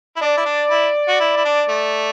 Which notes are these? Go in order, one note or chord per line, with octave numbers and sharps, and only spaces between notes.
E4
D4 D5
E4
D4
E4
F#4
E4
E4
D4
A3